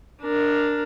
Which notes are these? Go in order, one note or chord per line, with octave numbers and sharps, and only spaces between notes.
D4 A#4